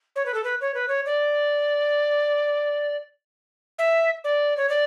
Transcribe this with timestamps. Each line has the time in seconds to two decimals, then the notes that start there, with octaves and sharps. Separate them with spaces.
0.15 C#5
0.25 B4
0.34 A4
0.43 B4
0.61 C#5
0.74 B4
0.88 C#5
1.05 D5
3.78 E5
4.24 D5
4.57 C#5
4.69 D5